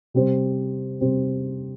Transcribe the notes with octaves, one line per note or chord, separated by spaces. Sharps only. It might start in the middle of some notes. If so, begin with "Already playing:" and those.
C3 G3 C4 G4 C5
C3 G3 C4 G4 C5